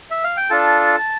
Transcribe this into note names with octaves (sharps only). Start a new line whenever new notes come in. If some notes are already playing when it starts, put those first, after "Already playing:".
E5
F5
G5
D4 F4 A4 A5